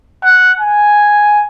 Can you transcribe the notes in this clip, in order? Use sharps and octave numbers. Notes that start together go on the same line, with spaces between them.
F#5
G#5